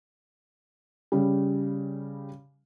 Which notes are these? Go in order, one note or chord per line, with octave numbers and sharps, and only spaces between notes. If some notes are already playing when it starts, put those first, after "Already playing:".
C#3 G3